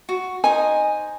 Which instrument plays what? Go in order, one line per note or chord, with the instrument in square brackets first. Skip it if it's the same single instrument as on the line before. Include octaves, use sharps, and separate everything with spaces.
[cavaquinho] F#4
[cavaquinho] D#4 C5 D#5 [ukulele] G#5